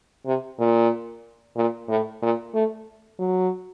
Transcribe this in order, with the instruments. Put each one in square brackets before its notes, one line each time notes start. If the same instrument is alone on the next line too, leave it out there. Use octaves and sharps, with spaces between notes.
[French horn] C3
A#2
A#2
A2
A#2
A3
F#3